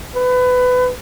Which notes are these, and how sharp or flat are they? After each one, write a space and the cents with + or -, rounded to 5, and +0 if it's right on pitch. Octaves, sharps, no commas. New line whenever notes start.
B4 +25